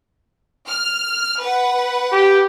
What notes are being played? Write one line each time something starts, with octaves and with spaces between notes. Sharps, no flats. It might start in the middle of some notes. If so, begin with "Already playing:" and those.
F6
B4 F#5
G4